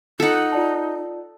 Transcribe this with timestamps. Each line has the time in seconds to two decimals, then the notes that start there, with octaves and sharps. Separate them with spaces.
0.20 D#4 F4 A4 F#5
0.52 F4 D5 A5